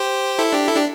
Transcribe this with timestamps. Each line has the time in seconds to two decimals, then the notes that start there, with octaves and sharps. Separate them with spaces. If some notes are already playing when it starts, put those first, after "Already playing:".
Already playing: G4 C5
0.39 E4 A4
0.52 D4 G4
0.67 E4 A4
0.76 D4 G4